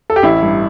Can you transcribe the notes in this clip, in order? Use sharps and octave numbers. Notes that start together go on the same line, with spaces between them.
A4
G4
A1 E4
G2